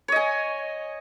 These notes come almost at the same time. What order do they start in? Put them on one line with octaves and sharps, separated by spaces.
C#5 D#5 G#5